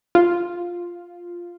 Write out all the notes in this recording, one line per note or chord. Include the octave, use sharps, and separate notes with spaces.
F4